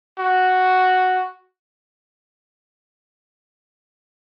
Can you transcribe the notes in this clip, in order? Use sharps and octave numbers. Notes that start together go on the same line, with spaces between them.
F#4